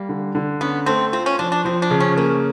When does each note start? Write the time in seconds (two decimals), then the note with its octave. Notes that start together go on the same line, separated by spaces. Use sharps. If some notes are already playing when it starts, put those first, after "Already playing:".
Already playing: G3 A#3
0.09 D3
0.35 D3
0.61 B3 C#4
0.86 A3 C4
1.13 C4 F4
1.26 C#4
1.39 F3 D4
1.52 D4
1.65 F3 C4
1.82 D4
1.90 C#3
2.00 C#4
2.16 A#3 C#4